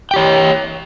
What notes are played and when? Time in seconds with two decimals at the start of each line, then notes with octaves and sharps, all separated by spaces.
0.11 G5
0.14 G4
0.16 C#5